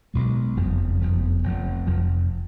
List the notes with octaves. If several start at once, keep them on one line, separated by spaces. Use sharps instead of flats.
B1 B2 G#3
F#1 F2 F3 B3
F#1 F2 F3 B3
F1 F2 F3
F1 F2 F3